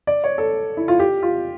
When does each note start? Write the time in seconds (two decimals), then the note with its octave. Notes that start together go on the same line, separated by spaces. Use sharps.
0.07 D5
0.24 C#5
0.38 A4
0.77 E4
0.88 F4
1.00 G4
1.23 F4